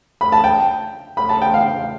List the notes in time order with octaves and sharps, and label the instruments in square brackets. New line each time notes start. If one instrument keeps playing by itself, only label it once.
[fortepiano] B5
A5
G5
B5
A5
G5
F5